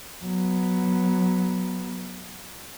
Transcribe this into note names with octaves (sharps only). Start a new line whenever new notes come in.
F#3 B3